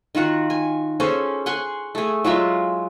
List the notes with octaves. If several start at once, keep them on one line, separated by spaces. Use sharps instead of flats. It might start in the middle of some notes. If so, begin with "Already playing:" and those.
D#3 F4 F#4 F#5
G#5
C#4 G#4 A4 C5
F#5 G#5 C6 C#6
A3 G#4
F#3 G#3 F4 E5